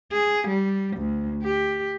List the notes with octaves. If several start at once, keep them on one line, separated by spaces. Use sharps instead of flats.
G#4
G3
D2
G4